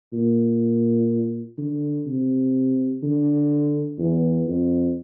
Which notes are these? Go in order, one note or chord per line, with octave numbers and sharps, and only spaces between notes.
A#2
D3
C3
D3
E2
F2